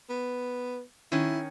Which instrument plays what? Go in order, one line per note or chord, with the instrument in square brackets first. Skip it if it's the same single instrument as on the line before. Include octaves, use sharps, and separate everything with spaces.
[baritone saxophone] B3
[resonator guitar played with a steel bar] D#3 C#4 [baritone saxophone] E4